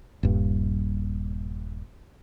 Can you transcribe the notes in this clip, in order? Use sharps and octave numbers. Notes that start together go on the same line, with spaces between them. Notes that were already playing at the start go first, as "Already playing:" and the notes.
D#1 G2